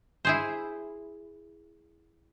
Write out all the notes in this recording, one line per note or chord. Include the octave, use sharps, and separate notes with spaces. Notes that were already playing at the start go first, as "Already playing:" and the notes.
E4 G#4 C5